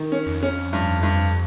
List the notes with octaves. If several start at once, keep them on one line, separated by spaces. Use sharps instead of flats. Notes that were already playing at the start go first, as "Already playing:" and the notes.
Already playing: D#3
C#4
F2
C#4
G2
G2